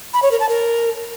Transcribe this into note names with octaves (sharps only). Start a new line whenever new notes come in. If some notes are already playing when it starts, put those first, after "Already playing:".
B5
C#5
A#4
A5
A#4